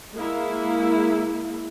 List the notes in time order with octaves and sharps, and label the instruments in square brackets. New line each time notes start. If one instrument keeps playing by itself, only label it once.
[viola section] G#3 A#3 E4